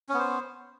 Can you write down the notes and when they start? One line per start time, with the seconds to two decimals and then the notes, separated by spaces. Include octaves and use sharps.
0.09 C#4
0.14 B3
0.19 C5